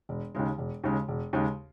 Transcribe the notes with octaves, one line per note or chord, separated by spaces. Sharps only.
E1
D#2 C#3 G#3
E1
D#2 C#3 G#3
E1
D#2 C#3 G#3